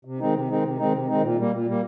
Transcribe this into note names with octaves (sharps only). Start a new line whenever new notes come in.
C3
D#3 G#3 C4 D#4
C3
D#3 G#3 C4 D#4
C3
D#3 G#3 C4 D#4
C3
D#3 G#3 C4 D#4
A#2
G3 A#3
A#2
G3 A#3